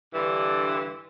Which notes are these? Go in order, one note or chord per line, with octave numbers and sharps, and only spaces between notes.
G2 D3 E3